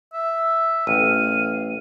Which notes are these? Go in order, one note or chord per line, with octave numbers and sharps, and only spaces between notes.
E5
A1 F5 D#7